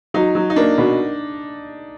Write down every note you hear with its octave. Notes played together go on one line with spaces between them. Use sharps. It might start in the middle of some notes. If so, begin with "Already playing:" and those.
F#3 D#4
F#3
D#4
A#3 D4
B2